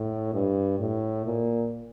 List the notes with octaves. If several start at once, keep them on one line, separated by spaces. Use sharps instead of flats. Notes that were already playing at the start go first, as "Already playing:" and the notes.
Already playing: A2
G2
A2
A#2